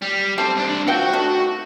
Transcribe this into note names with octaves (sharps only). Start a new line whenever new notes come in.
G3
G3 C4 A4 C5
C2 D4
C4 F4 F#4 F#5 G5
D#3 A3 D4